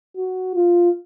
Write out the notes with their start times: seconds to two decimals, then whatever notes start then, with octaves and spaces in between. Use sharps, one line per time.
0.17 F#4
0.55 F4